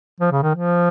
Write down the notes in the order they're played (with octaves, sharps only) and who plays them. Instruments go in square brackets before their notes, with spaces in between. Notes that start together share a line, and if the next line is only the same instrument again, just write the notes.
[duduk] F3
C#3
D#3
F3